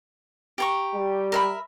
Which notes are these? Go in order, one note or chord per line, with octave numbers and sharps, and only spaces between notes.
G4 A#5 C#6
G3
A#4 E5 B5